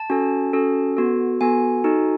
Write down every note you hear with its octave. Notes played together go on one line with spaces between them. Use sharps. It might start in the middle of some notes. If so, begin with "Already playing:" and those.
Already playing: A5
C#4 F#4 A4
C#4 F#4 A4
B3 F#4 A4
B3 F#4 A4 G#5
D#4 F#4 A4